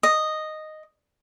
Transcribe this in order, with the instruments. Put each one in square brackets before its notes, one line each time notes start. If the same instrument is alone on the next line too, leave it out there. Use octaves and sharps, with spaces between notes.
[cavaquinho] D#5